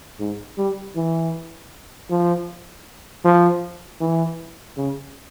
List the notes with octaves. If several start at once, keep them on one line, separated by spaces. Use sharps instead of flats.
G#2
G3
E3
F3
F3
E3
C#3